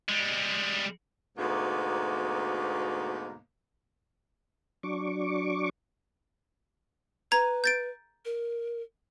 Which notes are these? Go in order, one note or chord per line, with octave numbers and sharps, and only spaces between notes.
G3 G#3
D2 G#2 B2 A#3 B3
F#3 D4 C#6 D6
B4 A#5 G#6
G6 A6 D7
A#4